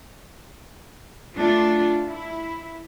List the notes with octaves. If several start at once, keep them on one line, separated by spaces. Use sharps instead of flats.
A3 D4 F4
E4